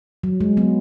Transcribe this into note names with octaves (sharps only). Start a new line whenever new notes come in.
F#3
G#3
F#3 B3